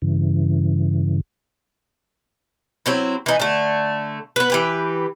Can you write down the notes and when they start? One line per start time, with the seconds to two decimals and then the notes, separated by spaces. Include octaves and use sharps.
0.02 G2 C#3 E3
2.86 F#3 C4 E4
3.26 E3 D#4
3.40 D3 A3
4.36 B3 B4
4.50 E3 G4 B4